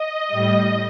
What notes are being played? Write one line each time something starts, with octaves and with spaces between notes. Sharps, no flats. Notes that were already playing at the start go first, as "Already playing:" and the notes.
Already playing: D#5
A2 G3